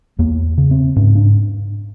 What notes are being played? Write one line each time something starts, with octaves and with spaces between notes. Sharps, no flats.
E2 A#3
C#3
C4
G#2 C#4
D4